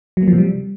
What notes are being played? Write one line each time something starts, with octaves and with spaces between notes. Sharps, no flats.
F#3
A#3
F3
C3
G3